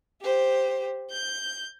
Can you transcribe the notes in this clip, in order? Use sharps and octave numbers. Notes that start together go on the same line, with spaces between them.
G4 C5
G6